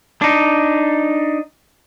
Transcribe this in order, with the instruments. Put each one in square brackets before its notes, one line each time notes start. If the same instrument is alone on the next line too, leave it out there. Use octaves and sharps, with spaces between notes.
[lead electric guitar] D4 D#4